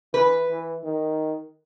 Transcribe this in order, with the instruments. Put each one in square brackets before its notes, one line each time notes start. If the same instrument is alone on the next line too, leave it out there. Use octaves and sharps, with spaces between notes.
[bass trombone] E3 [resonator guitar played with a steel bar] B4
[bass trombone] E3
D#3